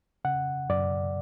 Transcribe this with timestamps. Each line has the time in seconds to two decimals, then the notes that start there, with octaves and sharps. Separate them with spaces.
0.25 C#3 F#5
0.69 F#2 D5